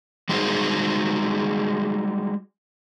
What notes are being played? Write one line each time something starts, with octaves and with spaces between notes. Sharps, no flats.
G3 G#3 D#4 F#4 G#4 C5